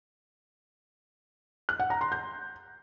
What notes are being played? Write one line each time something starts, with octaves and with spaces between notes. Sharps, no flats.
F#6
F#5
A#5
C6
G6